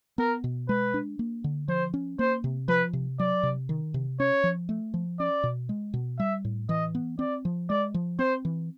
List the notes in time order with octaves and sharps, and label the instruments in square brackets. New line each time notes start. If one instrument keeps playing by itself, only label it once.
[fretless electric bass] B3 [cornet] A#4
[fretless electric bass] B2
[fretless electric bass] G#3 [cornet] B4
[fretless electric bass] D4
A#3
D3
[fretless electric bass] F3 [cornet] C5
[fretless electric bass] C#4
[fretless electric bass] A#3 [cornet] C5
[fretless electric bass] C3
[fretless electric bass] F3 [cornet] B4
[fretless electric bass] C3
[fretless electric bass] F#3 [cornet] D5
[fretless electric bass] C3
D#3
C3
[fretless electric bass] C#4 [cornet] C#5
[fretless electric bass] F3
A3
F3
[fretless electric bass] C#4 [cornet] D5
[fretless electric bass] B2
G#3
B2
[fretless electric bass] G3 [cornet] E5
[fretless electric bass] A2
[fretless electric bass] E3 [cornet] D#5
[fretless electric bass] B3
[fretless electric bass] C4 [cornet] D5
[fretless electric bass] F3
[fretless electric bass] G#3 [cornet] D5
[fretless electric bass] F3
[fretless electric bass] C4 [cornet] C5
[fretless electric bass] E3